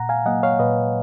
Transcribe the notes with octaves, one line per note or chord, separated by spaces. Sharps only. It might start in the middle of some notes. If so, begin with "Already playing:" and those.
Already playing: A#2 F#5 A#5
F5 G#5
F#3 A#3 D#5 F#5
C#5 F5
A#2 B4 D#5